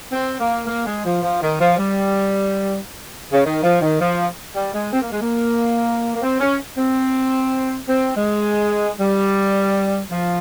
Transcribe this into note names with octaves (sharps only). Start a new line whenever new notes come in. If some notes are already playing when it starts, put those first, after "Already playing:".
C4
A#3
A#3
G#3
F3
F3
D#3
F3
G3
C#3
D#3
F3
D#3
F3
G3
G#3
C4
A#3
G#3
A#3
A#3
C4
C#4
C4
C4
G#3
G3
F3